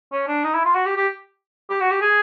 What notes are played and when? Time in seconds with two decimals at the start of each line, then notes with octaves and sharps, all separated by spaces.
0.12 C#4
0.28 D4
0.44 D#4
0.54 E4
0.65 F4
0.75 F#4
0.86 G4
0.96 G4
1.70 G4
1.81 F#4
1.91 G4
2.01 G#4